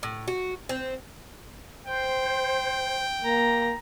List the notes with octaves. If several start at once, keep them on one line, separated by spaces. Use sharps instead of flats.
A2
F#4
C4
C5 G5
A#3 A#5